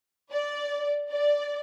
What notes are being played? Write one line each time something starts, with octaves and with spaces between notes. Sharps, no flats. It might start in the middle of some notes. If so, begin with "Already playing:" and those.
D5
D5